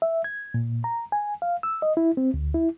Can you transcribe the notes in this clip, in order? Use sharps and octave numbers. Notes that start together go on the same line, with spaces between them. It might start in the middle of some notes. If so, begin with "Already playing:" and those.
E5
G#6
A#2
A#5
G#5
F5
E6
D#5
E4
C4
D2
E4